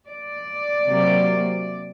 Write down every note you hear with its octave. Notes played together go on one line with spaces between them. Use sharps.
D5
C3 F#3 A#3